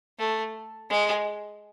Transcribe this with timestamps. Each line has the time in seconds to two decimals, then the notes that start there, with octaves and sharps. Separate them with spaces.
0.19 A3
0.90 G#3